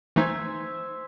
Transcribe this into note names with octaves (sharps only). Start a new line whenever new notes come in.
E3 A3 D#4 C5 E5 G#5